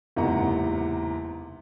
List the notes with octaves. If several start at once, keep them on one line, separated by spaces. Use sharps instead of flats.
F#1 E2 G#2 C3 F#5 A#5